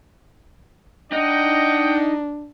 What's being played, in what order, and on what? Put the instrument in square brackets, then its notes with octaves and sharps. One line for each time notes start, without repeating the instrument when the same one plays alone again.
[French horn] D4 [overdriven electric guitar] D#4 [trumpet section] D#5 F#5 G5